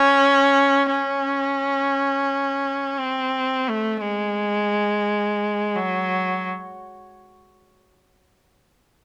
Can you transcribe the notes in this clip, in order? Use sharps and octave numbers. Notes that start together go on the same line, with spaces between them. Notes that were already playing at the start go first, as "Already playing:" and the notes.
Already playing: C#4
C#4
C4
A3
G#3
F#3